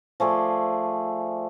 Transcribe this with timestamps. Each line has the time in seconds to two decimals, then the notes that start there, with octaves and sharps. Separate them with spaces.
0.20 F3 A3 G#4 D5